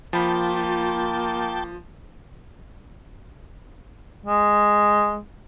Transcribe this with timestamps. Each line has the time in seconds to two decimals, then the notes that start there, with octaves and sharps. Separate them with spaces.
0.13 F3 A#3 F4 G5 A5 B5
4.26 G#3